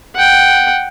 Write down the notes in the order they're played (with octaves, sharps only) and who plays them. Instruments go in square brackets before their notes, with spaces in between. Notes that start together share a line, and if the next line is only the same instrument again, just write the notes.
[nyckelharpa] F#5 G5